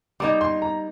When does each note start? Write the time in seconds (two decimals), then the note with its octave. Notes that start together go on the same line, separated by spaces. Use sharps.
0.20 G3 A#3 D#4 D6
0.41 C6
0.62 A#5